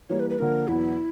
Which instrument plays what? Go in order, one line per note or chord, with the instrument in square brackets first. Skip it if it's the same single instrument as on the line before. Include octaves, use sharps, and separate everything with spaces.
[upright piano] E3 G3 A#3 [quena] C#5
[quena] B4
B4
[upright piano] D3 F3 A#3 [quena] A#4
[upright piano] E2 B2 F#3 B3 [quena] E4